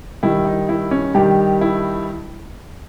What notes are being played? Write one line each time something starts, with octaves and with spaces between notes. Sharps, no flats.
G2 D#3 G3 E4
D#4
E4
C#4
G2 D#3 G3 G4
E4